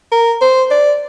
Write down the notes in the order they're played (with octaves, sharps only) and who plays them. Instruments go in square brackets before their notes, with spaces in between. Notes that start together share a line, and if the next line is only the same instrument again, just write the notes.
[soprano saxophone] A#4
C5
D5